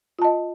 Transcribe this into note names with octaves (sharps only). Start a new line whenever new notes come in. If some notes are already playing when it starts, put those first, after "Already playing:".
F4 D#5 A5